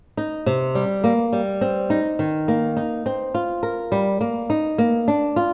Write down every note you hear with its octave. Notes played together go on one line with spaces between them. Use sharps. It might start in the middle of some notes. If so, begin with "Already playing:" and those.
D#4
C3
G3
A#3
G3
C4
D#4
D#3
A#3
D#4
C4
F4
A#4
G3
A#3
D#4
A#3
D4
F4